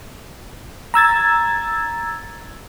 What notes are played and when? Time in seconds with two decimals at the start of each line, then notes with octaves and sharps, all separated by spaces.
0.94 A#5 E6 G#6 A6